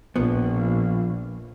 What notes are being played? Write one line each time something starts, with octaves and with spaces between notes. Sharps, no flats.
A#1 F3 B3